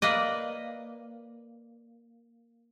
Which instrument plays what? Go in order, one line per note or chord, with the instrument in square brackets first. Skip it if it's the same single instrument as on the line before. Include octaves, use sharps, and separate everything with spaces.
[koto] A#3 B4 D5 D#5